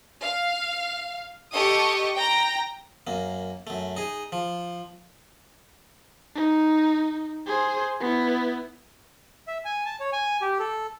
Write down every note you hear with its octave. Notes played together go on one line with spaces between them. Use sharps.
F5
G4 A4 D#5 C#6 D#6
G5 A#5 A#6
F#2 A#3
F#2 A3
D#4 G#4
F3
D#4
G#4 C5
B3 E4
E5
G#5
A5
C#5
G#5
G4
A4